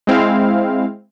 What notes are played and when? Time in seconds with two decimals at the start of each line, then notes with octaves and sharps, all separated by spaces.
0.07 G#3 C4 E4 F5